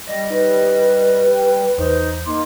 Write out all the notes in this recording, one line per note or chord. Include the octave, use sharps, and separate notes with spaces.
G3 D5 D#5 A#6
D#4 B4 C#5
G5
E2 D#4 C5 D6
A#3 D#4 C6 D6